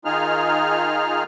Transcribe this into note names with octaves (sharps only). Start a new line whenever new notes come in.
D#3 D#4 F4 G#4 F6